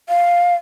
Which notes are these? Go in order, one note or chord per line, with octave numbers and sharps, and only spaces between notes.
F5